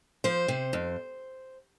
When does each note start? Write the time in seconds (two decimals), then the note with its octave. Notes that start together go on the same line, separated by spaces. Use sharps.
0.24 F3 C5
0.48 C3
0.73 F2